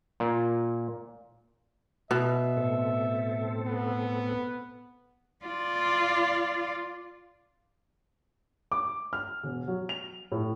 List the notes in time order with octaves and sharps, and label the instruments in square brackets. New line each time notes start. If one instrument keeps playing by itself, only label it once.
[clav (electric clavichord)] A#2
[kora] B2 [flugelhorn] E5
[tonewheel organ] A2 C4 A4
[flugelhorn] B3
[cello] F4 D5
[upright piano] D6
F6
E1
F#3
F7
A2